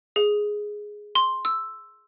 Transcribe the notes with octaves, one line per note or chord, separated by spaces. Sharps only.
G#4
C6
E6